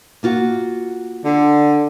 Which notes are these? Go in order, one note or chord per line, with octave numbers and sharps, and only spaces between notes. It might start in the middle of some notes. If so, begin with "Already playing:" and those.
A#3 F4 F#4
D3